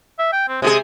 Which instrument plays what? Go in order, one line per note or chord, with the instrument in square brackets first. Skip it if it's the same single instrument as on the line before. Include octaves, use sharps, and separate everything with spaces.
[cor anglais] E5
G5
C4
[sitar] C3 G4 G#4 [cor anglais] G#3